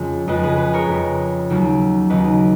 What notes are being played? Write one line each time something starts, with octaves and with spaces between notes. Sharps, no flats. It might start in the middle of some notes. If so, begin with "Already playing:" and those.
Already playing: F2 C#3 G#3
F2 C#3 G#3 B4 D#5
G#4 B4
G#4 B4
A#4 C#5
F2 C#3 G#3
D#2 C#3 F#3 A#3
D#2 C#3 F#3 A#3 B4 D#5